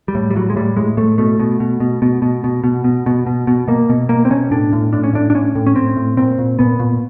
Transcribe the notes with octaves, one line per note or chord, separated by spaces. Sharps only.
G3
A2
G3
A2 F#3
G#3
A2 G3
A2 G#3
A2 A3
B2 A3
B2
B2
B2
B2
B2
B2
B2
B2
B2
B2
B2
B2 A#3
B2
B2 A#3
C4
B2 C#4
A2 D4
A2
A2 D4
C#4
A2 D4
D4
A2 C#4
A2
C#4
A2 C4
A2
A#2 C4
A#2
A#2 B3
A#2